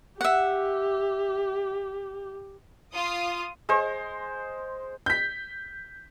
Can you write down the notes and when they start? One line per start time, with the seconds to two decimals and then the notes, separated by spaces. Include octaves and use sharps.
0.21 G4 E5 F#5
2.93 F4 D#6
3.69 G#3 C5
5.06 G6 B6